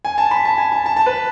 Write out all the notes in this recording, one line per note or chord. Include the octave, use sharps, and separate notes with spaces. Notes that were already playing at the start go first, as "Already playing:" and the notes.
G#5
A5
B5
A5
G#5
A5
A5
A5
B4